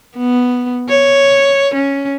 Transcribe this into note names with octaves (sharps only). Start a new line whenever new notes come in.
B3
C#5
C#4